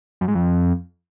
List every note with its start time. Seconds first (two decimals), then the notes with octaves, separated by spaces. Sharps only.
0.21 F#2
0.28 G#2
0.35 F2